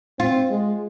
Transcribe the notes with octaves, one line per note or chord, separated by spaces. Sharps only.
C4 F4
G#3